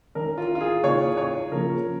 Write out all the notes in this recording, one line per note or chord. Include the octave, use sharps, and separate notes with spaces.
D#3 C#4 A#4
F4
F4
G#4
C#3 A#3 D#4 C#5
C#5
C#3 F3 A#3 C#4 A#4